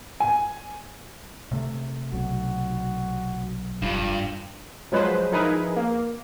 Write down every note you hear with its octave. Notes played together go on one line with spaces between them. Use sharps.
G#5
C3 A3
B1 F#4
F1 G2 F4
F3 F#3 G#3 B4 C5
F3 D#4 E4 G#4 A#4 B4
A#3